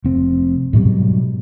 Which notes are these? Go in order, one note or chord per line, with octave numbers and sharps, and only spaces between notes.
F1 C4
G#2 B2 F#3 G3